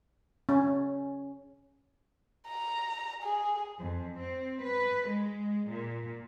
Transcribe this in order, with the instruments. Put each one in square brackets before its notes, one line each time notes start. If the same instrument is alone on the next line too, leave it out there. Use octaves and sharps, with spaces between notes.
[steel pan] C#4
[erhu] A#5
G#4
[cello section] F2
C4
B4
G#3
A#2